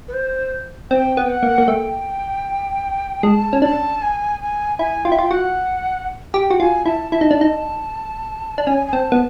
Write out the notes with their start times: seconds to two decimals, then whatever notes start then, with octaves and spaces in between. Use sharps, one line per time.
0.08 B4
0.13 C5
0.91 C4 G5
1.17 B3
1.29 F#5
1.43 A#3
1.58 A#3
1.68 A3 G5
3.23 G#3 A5
3.53 C#4
3.62 D4 A5
4.02 G#5
4.41 G#5
4.78 E4 G#5
5.05 F4 G5
5.12 E4
5.19 F4
5.31 F#4 F#5
6.34 G4 G5
6.50 F#4
6.59 F4 G#5
6.86 E4 A5
7.12 E4 A5
7.21 D#4
7.31 D4
7.41 D#4
8.58 D4
8.66 C#4 G#5
8.87 G#5
8.93 C4 A5
9.12 B3